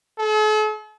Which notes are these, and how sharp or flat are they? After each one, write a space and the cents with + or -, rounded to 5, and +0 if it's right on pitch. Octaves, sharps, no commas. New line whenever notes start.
A4 -45